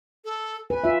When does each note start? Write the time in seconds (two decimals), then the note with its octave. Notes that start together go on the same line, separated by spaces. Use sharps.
0.25 A4
0.70 B4 G#5
0.84 F4 E5